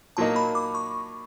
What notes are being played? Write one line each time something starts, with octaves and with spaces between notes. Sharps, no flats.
A#2 F#3 A#3 D#4 A5
B5
D6
C#6